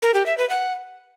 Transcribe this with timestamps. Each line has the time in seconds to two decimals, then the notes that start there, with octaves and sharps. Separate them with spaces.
0.02 A#4
0.14 G4
0.26 E5
0.38 B4
0.50 F#5